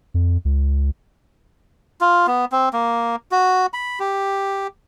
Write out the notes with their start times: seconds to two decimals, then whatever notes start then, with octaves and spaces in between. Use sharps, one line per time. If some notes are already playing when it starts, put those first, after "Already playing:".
0.14 F2
0.45 C#2
2.01 F4
2.27 B3
2.52 C4
2.73 A#3
3.32 F#4
3.73 B5
4.00 G4